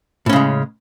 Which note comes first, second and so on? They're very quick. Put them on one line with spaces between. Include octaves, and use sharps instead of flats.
A2 C#4 C#3 G#3